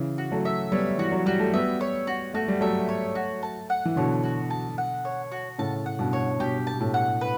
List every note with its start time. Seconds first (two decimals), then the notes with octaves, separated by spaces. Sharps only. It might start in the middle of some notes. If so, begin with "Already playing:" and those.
Already playing: C#3 E3
0.18 F#4
0.32 F#3 A3
0.45 E5
0.72 G3 B3 C#5
0.98 E3 F#4
1.12 F#3
1.26 G3 F#4
1.39 A3
1.53 G3 B3 E5
1.81 C#5
2.07 F#4
2.34 A3 F#4
2.48 G3
2.61 F#3 A3 E5
2.89 C#5
3.15 F#4
3.43 A5
3.70 F#5
3.85 E3
3.96 B2 D3 C#5
4.23 F#4
4.50 A5
4.78 F#5
5.05 C#5
5.32 F#4
5.58 A2 C#3 A5
5.86 F#5
5.99 G2 B2
6.13 C#5
6.40 G2 B2 G4
6.67 A5
6.74 B2
6.80 A2
6.94 F#5
7.21 B4